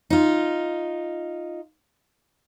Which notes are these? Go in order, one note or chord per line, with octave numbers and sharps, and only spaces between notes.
D#4 F4